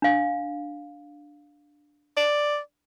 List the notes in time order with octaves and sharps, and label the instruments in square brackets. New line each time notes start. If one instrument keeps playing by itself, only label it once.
[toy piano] D4 F5
[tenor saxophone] D5